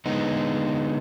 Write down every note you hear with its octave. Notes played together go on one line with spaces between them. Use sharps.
D3 G#3 B3 D#4